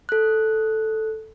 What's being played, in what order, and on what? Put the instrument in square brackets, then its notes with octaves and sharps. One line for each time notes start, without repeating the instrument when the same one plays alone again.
[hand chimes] A4 F#6